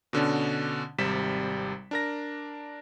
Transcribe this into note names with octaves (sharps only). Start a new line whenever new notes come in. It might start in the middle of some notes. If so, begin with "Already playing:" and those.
B2 D3 C#4 D4
G#1 C3 G3 B6 E7
D4 A#4 A#6